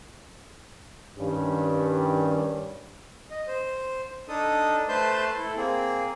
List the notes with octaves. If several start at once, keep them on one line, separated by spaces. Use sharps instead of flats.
G2 D#3 G3 C#4
D#5
C5
D4 D#4 A4 D#6
A3 B4 C5 A5 C6 G6
E4 A4
A#3 C4 G#4